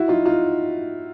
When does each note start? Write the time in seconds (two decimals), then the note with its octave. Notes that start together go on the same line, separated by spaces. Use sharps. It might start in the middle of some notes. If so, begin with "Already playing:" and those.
Already playing: E4 F#4
0.08 D#4 F4
0.25 D#4 F4